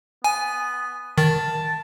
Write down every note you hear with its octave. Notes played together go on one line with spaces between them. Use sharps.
B3 G#5
D#3 A5